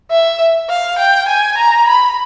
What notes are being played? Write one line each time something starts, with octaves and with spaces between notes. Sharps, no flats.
E5
F5
G5
G#5
A#5
B5